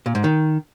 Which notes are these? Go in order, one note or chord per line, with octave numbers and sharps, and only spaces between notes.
A#2
G#2
D#3